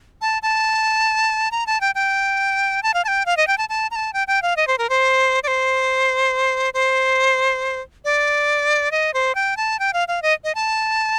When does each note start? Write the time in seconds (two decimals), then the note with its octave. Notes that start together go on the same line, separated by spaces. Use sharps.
0.21 A5
0.42 A5
1.51 A#5
1.67 A5
1.81 G5
1.95 G5
2.83 A5
2.94 F5
3.04 A5
3.08 G5
3.26 F5
3.37 D#5
3.47 G5
3.58 A5
3.69 A5
3.91 A#5
3.96 A5
4.13 G5
4.28 G5
4.42 F5
4.57 D#5
4.67 C5
4.78 A#4
4.90 C5
5.43 D5
5.48 C5
6.74 C5
8.05 D5
8.92 D#5
9.14 C5
9.35 G5
9.57 A5
9.79 G5
9.93 F5
10.08 F5
10.22 D#5
10.44 D#5
10.55 A5